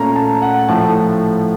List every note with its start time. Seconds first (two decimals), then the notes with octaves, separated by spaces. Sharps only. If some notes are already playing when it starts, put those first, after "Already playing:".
Already playing: A#2 A3 C#4 A#5
0.16 A5
0.42 F#5
0.68 A2 F3 A3 A5